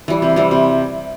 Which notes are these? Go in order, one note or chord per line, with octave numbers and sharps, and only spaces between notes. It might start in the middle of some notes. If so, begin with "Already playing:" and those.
E3 G3
C3
E3 G3 C4
C3